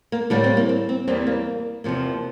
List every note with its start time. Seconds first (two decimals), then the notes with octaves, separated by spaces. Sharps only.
0.12 A#3
0.30 A2 D3 G3 A#3 D4
0.44 C4
0.57 A#3
0.69 C4
0.89 C4
1.08 E2 E3 G3 A#3 C4
1.27 A#3
1.84 E2 C3 F3 A#3